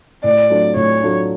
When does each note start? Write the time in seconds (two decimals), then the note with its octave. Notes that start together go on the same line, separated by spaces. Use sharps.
0.24 A2 D5
0.50 F#3 A3 D4 F4
0.76 A2 C#5
1.03 F#3 A3 D4 F4